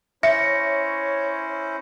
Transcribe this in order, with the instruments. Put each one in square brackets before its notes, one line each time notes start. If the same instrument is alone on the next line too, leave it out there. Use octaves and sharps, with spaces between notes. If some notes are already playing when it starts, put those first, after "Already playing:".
[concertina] C#4 E4 C5 [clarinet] C#5 [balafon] E5 [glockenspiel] A#6 C#7